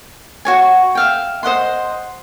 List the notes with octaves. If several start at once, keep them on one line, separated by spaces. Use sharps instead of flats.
F#4 C#5 G#5
E5 F5 G5
C5 D#5 F#5 C6